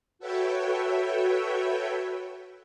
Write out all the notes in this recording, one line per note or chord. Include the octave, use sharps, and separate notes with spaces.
F#4 A4 B4 C#5 E5 G5